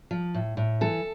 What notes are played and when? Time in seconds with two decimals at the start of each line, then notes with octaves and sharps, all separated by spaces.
0.11 F3
0.34 A2
0.57 A2
0.81 E3 A4